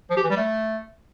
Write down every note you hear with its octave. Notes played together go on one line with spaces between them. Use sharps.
F3
G4
E3
G3
A3